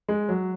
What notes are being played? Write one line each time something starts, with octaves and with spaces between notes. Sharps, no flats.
G#3
F#3